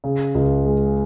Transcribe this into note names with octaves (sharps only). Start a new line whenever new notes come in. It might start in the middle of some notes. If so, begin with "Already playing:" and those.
C#3
C#2
G#3